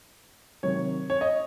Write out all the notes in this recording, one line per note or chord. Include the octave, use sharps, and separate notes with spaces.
C3 D#3 F#3 C#5
C#5
D#5